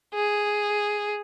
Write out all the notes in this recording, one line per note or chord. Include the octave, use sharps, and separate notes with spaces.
G#4